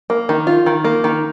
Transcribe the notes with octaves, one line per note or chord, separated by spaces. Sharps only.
A#3
D#3
F4
D#3
A#3
D#3